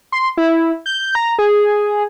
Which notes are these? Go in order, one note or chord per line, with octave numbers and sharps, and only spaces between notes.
C6
E4
G6
A#5
G#4